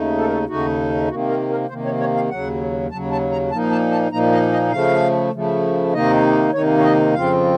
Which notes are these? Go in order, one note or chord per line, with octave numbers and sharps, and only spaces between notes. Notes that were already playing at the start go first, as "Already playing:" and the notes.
Already playing: D#2 C#3 A3 D#4
A4
A#4
A4
D#2 C#3 A3 D#4 F#4
C3 D#3 A#3 F#4
A#4
A#4
C3 D#3 A#3 C5
C#5
C#5
F5
D#2 C#3 F#3 F#5
D#2 C#3 F#3 A5
A5
A#5
A#2 F3 A#3 D#4 A5
A5
A5
A#2 F3 A#3 D#4 A#5
D#5
D#5
C#3 F3 A3 F5
C#3 F3 A3
C3 D#3 A#3 D#4 D#5
C3 D#3 A#3 D#4 C#5
C#5
D#5
F2 C#3 F3 C4 F4 F5